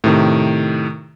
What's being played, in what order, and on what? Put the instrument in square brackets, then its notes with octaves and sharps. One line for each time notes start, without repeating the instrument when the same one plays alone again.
[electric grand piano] A2 C3 D#3